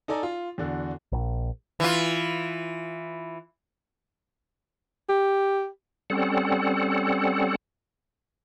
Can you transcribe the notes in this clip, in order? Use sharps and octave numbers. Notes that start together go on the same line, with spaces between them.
D#4 A4 D5 G#5 A#5
F4
E2 D3 F#4
A#1
E3 F4
G4
G3 C4 C#4 A4 F#5